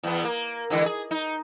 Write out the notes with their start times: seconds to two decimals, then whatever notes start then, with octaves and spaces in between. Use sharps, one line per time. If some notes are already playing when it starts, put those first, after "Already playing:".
0.03 E2 B3
0.25 A#3
0.70 D3 E3 G#3
0.86 G#4
1.11 D#4